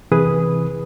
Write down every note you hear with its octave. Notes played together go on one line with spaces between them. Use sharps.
C3 E3 G#4 B4 D#6